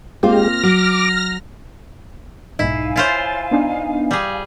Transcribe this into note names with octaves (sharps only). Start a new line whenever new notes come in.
G#3 A#3 C4 F4 G4 F6 A#6
F#3 D6
B1 G#2 D#4 E4 F5 G#5
E4 F4 C5 C#5 A6
B3 D4 D#4
G3 G#4